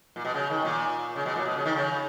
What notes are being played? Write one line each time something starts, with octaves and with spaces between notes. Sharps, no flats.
A#2
B2
C#3
D#3
A#2
C#3
B2
A#2
B2
C#3
D#3
C#3